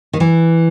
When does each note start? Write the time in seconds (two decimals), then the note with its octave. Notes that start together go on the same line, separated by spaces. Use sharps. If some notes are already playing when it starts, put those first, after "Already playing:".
0.13 D#3
0.20 E3